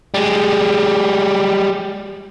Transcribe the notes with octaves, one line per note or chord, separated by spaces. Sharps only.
G3 G#3